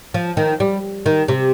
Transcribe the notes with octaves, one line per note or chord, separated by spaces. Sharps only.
F3
D#3
G3
D#3
C3